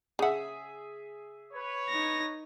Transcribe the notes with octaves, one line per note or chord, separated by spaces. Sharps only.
C#3 G#4 E5 F#5
B4 C#5
D#4 A#6